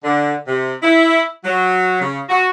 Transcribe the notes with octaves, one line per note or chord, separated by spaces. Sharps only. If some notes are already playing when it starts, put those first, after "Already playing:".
D3
C3
E4
F#3
C#3
F#4